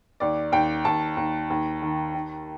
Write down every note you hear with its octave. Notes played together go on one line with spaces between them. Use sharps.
D#2 D5
D#2 G5
D#2 A5
D#2
D#2
D#3
D#3